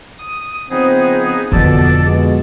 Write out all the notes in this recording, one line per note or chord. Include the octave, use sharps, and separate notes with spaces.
D#6
C#3 F3 B3 C4 D#4 G#4
F2 B2 D3 A4 D5 A5
B2 G#3